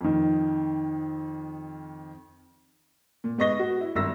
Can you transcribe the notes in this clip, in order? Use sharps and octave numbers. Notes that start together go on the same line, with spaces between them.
F2 D#3
A#2
G#2 B3 D#5 C#6 A#6 G7
F#4
E4
G#1 G2 E5 E6 A#6